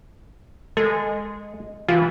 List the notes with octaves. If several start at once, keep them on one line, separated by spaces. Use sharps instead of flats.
G#3 A4
E3 F4